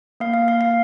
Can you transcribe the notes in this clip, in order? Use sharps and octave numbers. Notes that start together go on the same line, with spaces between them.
A#3 F5
F5
A#3 F5
F5